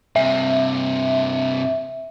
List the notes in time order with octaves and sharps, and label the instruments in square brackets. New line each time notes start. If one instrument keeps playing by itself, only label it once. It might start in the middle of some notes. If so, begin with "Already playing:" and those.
[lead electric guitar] G2 C3 [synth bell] E5